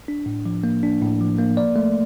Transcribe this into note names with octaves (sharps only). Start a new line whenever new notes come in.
D4
A2
F3
A#3
D4
A2
F3
A#3
D5
A3